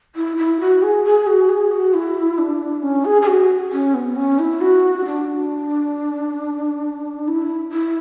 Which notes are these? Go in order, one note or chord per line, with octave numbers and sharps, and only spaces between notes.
E4
E4
F#4
G#4
G#4
F#4
G#4
F#4
E4
D4
C#4
G#4
G#4
F#4
C#4
B3
C#4
E4
F#4
D4
E4
E4